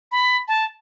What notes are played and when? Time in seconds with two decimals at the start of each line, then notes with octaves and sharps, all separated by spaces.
0.12 B5
0.48 A5